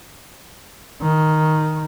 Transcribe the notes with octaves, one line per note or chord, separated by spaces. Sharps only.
D#3